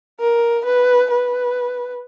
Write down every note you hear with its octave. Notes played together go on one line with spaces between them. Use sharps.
A#4
B4
B4